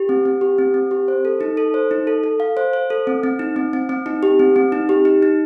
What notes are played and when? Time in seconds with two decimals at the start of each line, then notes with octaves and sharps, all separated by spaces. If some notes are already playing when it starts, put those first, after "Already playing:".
Already playing: G4
0.09 C4
0.25 C4
0.41 G4
0.58 C4
0.74 C4
0.91 G4
1.08 C5
1.25 A4
1.41 D#4
1.57 A4
1.74 C5
1.91 D#4
2.07 A4
2.24 A4
2.40 F5
2.57 C5
2.73 C5
2.90 A4
3.07 C4
3.23 C4
3.39 D#4
3.56 C4
3.73 C4
3.89 C4
4.06 D#4
4.23 G4
4.39 C4
4.56 C4
4.72 D#4
4.89 G4
5.05 D#4
5.22 D#4